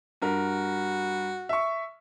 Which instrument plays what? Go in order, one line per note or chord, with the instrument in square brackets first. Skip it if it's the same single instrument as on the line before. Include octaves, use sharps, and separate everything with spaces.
[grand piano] G2 A#4 [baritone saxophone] F#4
[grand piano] E5 C#6